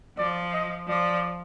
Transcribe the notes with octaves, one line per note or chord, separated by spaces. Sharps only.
F3 D5
D#5
F3 D5